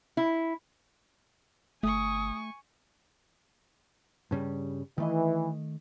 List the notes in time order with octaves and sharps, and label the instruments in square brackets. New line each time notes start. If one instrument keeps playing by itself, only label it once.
[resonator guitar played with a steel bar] E4
[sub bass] G1 [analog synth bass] A3 [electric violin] G#5 C#6 [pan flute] D#6
[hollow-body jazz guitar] G2 C#3 G3
[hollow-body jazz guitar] D#3 A3 D#5 [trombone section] E3